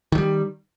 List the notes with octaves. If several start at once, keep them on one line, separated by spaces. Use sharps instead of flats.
D#3 F#3 G3